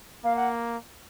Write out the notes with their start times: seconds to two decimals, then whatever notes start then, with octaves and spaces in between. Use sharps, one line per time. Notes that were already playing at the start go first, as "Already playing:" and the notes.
0.24 A#3 F5
0.36 F#5